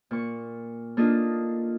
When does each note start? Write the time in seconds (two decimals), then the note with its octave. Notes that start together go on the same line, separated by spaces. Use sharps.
0.11 A#2 C#6
0.97 A#3 D4 D#4 F4 A4 D#5